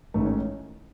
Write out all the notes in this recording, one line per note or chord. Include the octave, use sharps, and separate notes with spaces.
A1 G#2 D#3 A3
C#4